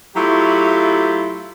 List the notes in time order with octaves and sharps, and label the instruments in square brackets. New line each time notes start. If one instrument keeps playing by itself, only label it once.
[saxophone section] F#3 A3 E4 F4 G4